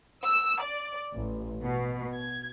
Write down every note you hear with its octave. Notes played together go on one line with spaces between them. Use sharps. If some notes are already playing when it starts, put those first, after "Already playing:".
E6
D5
A1
B2
G#6